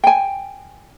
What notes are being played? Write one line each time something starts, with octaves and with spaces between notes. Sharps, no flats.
G5 G#5